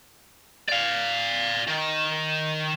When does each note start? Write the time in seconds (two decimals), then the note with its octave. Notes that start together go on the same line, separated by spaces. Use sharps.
0.69 D5 F5
1.67 D#3